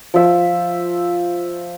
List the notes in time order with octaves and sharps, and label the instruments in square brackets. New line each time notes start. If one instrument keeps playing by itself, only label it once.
[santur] F3 E5